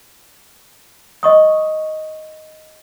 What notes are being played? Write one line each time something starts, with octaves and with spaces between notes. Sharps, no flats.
D#5 C#6 D#6